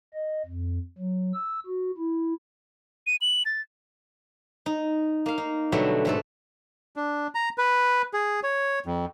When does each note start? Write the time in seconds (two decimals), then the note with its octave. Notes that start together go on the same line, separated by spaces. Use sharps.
0.13 D#5
0.46 F2
0.98 F#3
1.34 E6
1.66 F#4
1.97 E4
3.07 D#7
3.21 F#7
3.46 A6
4.66 D#4
5.26 A#3 F5
5.38 D#4
5.72 B2 D3 F#3 G3 A3
6.05 G#2 A3 A4
6.96 D4
7.35 A#5
7.58 B4
8.13 G#4
8.43 C#5
8.86 F2